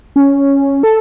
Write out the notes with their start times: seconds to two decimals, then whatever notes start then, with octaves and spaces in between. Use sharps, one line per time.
0.16 C#4
0.83 A4